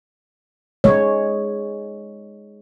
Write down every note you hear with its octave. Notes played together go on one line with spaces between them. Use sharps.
G#3 C#5